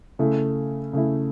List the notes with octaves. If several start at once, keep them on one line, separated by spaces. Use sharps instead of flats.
C#3 A3 E4
C#3 A3 E4